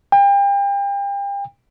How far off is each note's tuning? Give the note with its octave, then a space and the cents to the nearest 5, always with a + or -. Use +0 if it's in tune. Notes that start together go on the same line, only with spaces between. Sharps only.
G5 +35